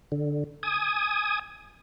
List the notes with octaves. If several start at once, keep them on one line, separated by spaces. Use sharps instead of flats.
D3
G#5 D#6